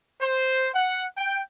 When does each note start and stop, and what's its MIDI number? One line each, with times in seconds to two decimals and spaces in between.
0.21 0.69 72
0.72 1.05 78
1.17 1.41 79